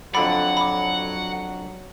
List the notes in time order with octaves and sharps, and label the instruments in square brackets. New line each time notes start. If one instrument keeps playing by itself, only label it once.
[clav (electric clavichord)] F2 D3 D5 [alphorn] F#3 [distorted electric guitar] F#5 [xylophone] B5
[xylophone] B5 D6